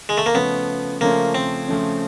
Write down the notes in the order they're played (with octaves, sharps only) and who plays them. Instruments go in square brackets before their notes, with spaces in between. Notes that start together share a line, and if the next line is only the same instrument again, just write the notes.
[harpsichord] G#3
A3
A#3
[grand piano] C#3 F3 A3 C#4 [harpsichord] B3
[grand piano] C#3 F3 A3 C#4 [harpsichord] A#3
[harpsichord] C4
[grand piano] C#3 F3 A3 C#4